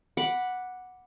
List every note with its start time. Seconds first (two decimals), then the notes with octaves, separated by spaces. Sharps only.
0.17 F#5 B5 D6